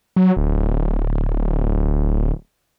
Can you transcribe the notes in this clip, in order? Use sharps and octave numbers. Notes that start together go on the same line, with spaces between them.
F#3
D1